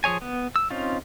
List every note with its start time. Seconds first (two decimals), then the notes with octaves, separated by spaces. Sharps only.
0.04 F3 G#4 C#5 G#5
0.21 B3
0.56 E6
0.70 C4 C#4 D#4 F4